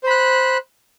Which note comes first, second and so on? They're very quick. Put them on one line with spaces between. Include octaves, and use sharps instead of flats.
C5 B5 F#6